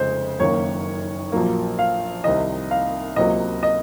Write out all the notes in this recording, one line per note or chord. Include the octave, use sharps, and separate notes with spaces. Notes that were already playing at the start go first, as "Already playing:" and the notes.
Already playing: F1 F2 C#3 G#3 C5
F#1 F#2 D#3 A#3 C#5
A#1 A#2 F#3 A#3
F5
C2 C3 D#3 D#5
F5
C#2 C3 F#3 A#3 D#5
D#5